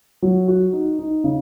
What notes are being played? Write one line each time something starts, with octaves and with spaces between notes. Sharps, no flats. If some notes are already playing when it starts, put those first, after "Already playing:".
F#3
F#4
D#4
D#4
C#3